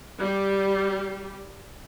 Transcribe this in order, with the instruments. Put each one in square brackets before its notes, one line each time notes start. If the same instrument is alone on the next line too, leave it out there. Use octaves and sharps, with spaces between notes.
[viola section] G3 G4